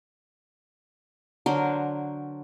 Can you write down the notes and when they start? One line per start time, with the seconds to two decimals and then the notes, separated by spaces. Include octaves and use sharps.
1.46 D3 F#3 A#4 C5